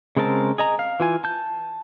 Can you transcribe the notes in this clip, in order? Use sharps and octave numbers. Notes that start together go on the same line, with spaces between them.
C#3 G#3 C4 A#4 A5
G#4 D#5 A#5
F5
E3 F4 G#5
A5 G6